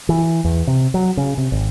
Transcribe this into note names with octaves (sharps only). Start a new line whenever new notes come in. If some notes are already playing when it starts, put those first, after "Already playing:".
E3
E2
C3
F#3
C#3
C3
G#1